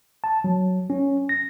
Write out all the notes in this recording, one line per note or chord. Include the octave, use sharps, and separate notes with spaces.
A5
F#3
C#4
A#6